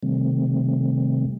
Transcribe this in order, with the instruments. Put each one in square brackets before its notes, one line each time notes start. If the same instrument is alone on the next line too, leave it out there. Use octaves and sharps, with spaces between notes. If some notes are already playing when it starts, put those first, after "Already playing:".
[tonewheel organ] C3 D#3 G3 A3 C4